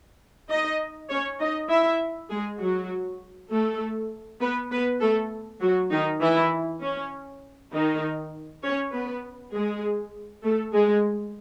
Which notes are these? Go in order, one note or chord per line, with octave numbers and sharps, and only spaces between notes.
D#4 D#5
C#4 C#5
D#4 D#5
E4 E5
G#3 G#4
F#3 F#4
A3 A4
B3 B4
B3 B4
A3 A4
F#3 F#4
D#3 D#4
E3 E4
C#4
D#3 D#4
C#4 C#5
B3 B4
G#3 G#4
A3 A4
G#3 G#4